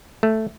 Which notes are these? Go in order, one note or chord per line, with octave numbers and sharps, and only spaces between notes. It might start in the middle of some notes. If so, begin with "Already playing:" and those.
A3